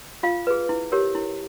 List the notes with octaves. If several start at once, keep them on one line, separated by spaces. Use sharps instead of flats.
F4 F5
G#4 B4
E4
G4 A#4 C#5
E4